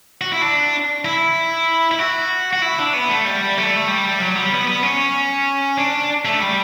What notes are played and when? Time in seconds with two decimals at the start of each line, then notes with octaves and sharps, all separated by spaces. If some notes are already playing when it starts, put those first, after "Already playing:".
0.21 F#4
0.32 E4
0.42 D4
1.05 E4
1.91 E4
1.99 F#4
2.53 F#4
2.62 E4
2.79 D4
2.93 B3
3.09 A3
3.25 G3
3.57 A3
3.88 G3
4.20 F#3
4.35 G3
4.51 B3
4.67 B3
4.83 C#4
5.78 D4
6.25 A3
6.40 G3